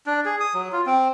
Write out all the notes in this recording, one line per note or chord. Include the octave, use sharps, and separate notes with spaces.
D4
G#4
D#6
F#3
F4
C4